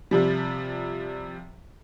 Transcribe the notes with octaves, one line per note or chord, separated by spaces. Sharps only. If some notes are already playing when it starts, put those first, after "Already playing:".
C3 F3 G3